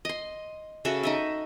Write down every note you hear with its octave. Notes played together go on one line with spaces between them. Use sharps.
D#5 C6
C#3 F#4 A4 E5
D#4 D#5 E5